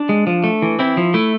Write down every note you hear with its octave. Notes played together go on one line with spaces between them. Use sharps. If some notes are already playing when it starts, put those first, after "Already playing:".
Already playing: D4
G#3
F3
A3
E3
C4 E4
F3
A3 E4